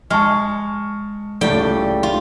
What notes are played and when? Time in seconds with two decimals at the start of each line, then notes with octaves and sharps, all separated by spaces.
0.10 G#3 A5 C#6 F6
1.41 C#2 A2 G3 A3 G5
2.03 F4